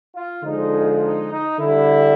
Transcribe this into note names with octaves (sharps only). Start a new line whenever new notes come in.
F4
D3 F3 G#3 D#4
D#4
D#4
D3 G3 E4